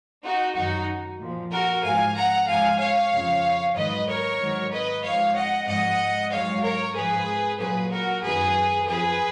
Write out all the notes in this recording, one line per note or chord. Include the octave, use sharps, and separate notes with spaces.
D#4 F#4
F#2 D#3 F#3 D#4 F#4
A#2 F3
F#4 A#4
G#2 F3 F5 G#5
F#5 A#5
G#2 F3 F5 G#5
C#5 F5
F2 C#3 F3
G#2 D#3 F#3 B4 D#5
A#4 C#5
G#2 D#3 F#3
B4 D#5
G#2 F3 C#5 F5
D#5 F#5
G#2 F3 D#5 F#5
G#2 F#3 C#5 F5
A#4 C#5
G#2 F3 G#4 B4
A#2 F#3 G#4 B4
F#4 A#4
F#2 D#3 F#3 G#4 B4
F2 F3 G#4 B4